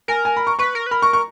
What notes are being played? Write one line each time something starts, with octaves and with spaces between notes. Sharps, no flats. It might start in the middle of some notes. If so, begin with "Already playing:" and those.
A#4 G#5
G#5
B5
C#6
B4 C#6
A#4
B4
A#4 B5
C#6
C#6